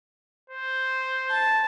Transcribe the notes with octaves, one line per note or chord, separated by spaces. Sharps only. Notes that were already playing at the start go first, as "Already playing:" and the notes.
C5
A5